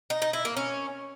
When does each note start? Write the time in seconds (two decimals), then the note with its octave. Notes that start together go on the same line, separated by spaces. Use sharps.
0.10 D#4
0.22 D#4
0.33 E4
0.45 A#3
0.57 C#4